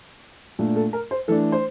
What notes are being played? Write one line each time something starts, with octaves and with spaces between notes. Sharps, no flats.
A#2 A3 D4
A4
A#4
C5
E3 A3 D4 A4
C5